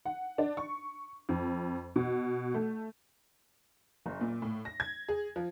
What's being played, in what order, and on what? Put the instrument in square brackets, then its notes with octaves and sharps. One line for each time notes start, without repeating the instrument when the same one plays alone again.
[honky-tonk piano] F#5
D4
C#6
F2
B2
A3
F#1
A#2
A2
A#6
G#6
G#4
F3